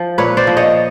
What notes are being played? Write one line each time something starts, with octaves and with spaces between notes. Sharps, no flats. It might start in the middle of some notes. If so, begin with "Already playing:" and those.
Already playing: F3
A#2 B4 C#5
C5 D5
F3
C#5 D#5